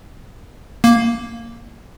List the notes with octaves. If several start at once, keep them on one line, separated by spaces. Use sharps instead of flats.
A#3